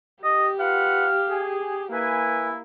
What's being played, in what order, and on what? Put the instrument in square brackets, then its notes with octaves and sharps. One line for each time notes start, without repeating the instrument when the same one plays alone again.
[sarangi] G4 [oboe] D#5
[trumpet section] F4 B4 F#5 [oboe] F5
[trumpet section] G#4
[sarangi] A#3 [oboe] E4 [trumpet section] B4 G#5